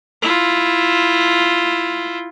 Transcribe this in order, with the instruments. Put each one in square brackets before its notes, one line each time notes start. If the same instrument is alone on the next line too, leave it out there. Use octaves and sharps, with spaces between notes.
[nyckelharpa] E4 F4